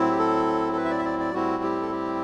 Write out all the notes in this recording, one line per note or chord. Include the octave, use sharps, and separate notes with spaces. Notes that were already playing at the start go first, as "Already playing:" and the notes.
Already playing: A2 F#3 C4 E4
G4
A4
A4
B4
E5
D5
E5
D5
D5
A2 G3 C4 E4 F#4
G4
A4
G4